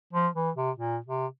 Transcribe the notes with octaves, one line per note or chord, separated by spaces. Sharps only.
F3
E3
C3
A#2
C3